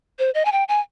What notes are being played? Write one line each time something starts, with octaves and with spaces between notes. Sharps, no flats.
C5
D#5
G#5
G5
G#5